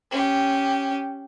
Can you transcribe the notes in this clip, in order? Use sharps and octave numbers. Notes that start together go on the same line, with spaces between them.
C#4 G4